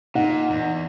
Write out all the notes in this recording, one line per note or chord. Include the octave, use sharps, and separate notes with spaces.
A#2 D#4 F#5
E2